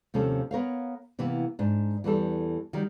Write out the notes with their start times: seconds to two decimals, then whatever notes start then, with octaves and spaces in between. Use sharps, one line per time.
0.14 D#2 C3 F3 C#4 A4
0.51 B3 A#4 C#5 F5
1.19 C3 E3 A#3 B3
1.59 G#2 D4
2.04 E2 E3 G3 A4
2.73 D#3 F#3 G3